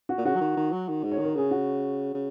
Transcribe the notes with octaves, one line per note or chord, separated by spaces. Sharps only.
F#4
A#2
C#3 F#4
F#3
D#3
D#3
F#3
D#3
G#2
C#5
D#3
A#4
C#3 G#4
F#4
C#3